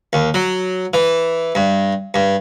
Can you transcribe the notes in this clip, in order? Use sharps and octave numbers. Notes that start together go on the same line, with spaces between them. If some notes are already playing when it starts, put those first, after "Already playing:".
D#2
F#3
E3
G2
G2